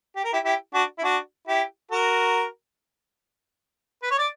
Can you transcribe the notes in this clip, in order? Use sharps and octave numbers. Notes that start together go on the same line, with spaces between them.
G4
A#4
E4 G4
E4 G4
D4 F#4
E4
D4 F#4
E4 G4
F#4 A#4
B4
C#5
D5